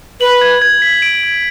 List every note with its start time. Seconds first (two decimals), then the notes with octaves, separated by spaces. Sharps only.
0.20 B4 F#7
0.41 G#6
0.62 G#6
0.82 B6
1.02 D7
1.23 G#6